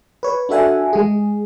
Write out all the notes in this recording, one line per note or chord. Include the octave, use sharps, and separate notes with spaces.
B4 C#5
D4 F#4 A4 E5 F#5 G#5
G#3 G#4